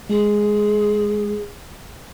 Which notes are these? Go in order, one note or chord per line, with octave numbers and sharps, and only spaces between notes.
G#3 G#4